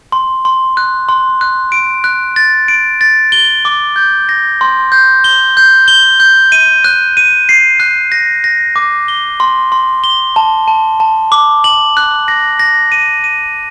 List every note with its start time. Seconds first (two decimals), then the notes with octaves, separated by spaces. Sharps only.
0.12 C6
0.45 C6
0.77 F#6
1.09 C6
1.41 F#6
1.72 D7
2.04 F#6
2.36 A6
2.68 D7
3.01 A6
3.32 G7
3.65 D6
3.96 G6
4.29 A#6
4.61 C6
4.92 G6
5.24 G7
5.57 G6
5.88 G7
6.20 G6
6.52 D#7
6.84 F#6
7.17 D#7
7.49 C7
7.80 F#6
8.12 A#6
8.44 A#6
8.76 D6
9.08 G7
9.40 C6
9.72 C6
10.04 G7
10.36 A5
10.68 A5
11.00 A5
11.32 D6
11.64 F#7
11.97 F#6
12.28 A#6
12.59 A#6
12.92 D#7
13.24 D#7